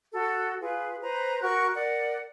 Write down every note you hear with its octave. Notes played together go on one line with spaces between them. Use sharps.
F#4 A4
F4 G#4 B4
B4 C5 A#5
F#4 A#4 C#6 F#6
A#4 D5 F#5